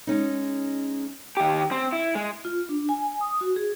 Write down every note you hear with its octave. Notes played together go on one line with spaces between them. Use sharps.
G#3 C#4 D#4
D#3 G4
C4
E4
G#3
F4
D4
G#5
D#6
F#4
G#4